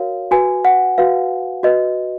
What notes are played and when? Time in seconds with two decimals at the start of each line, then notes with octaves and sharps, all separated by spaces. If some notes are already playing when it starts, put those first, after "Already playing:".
Already playing: F#4 A#4 C#5 F5
0.31 F#4 B4 G#5
0.65 F#5
0.98 F#4 B4 F5
1.63 F#4 B4 D#5